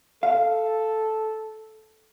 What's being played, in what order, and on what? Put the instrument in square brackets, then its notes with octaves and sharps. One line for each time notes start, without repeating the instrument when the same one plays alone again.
[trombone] A4 [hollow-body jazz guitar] F5